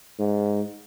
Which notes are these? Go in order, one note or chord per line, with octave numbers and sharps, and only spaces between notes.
G#2